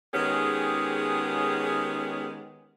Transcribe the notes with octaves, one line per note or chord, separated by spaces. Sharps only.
D#3 G#3 B3 C#4 G4 G#4